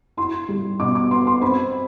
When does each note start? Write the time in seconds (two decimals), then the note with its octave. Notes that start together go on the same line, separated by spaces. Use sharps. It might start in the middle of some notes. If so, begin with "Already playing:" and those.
0.17 E4 C6
0.49 G3
0.80 B2 D6
0.95 D6
1.11 B3 C6
1.27 C6
1.41 C4 B5